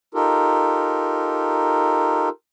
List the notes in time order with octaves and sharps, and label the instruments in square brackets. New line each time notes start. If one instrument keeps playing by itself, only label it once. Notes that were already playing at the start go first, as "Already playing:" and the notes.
[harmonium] D#4 F4 G4 A4 A#4